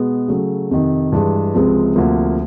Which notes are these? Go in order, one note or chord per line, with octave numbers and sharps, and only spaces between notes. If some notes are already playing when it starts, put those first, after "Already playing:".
Already playing: B2 G#3 B3
C#3 F#3 A3
F2 C3 D#3
G2 E3 G#3
C#2 C3 F3 G#3 C4
D2 C3 F3 A#3